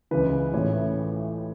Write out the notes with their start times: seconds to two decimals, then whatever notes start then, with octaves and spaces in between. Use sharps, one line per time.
0.11 C#2 C#3 E3 B4
0.53 A1 A2 E3 C#5